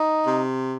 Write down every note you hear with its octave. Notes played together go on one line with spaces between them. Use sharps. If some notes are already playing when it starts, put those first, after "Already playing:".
Already playing: D#4
C3